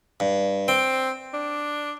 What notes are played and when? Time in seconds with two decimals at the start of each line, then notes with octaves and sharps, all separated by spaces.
0.20 G2
0.68 C4 G5
1.34 D4